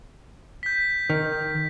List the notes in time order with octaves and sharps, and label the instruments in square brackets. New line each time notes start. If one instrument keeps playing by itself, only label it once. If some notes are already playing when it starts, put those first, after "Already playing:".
[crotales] G6 B6
[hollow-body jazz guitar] D#3